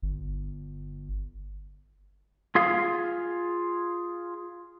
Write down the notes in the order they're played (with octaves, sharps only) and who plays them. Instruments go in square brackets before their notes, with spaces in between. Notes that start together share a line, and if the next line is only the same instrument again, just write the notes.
[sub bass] G1
[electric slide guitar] F4 G#4 F5